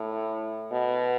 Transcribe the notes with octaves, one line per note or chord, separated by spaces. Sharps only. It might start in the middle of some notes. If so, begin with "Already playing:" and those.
Already playing: A2
B2